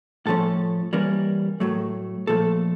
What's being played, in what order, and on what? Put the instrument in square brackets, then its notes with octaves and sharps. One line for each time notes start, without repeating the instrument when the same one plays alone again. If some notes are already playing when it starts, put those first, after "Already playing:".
[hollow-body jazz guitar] A2 F3 A3 C#4 A4
E3 G3 A#3 C#4 A#4
A2 F#3 A3
A#2 F3 A3 A4